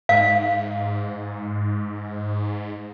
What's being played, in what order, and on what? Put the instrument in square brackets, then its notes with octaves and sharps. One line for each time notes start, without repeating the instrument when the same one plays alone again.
[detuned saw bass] G#2 [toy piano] F5